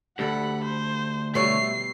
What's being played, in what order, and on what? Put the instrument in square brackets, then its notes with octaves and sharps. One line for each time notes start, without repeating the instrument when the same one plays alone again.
[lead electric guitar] D2 [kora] G4 A4 D5 [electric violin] F#5 B5
[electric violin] C5
[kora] B2 G3 [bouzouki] A3 C#5 E5 [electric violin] C7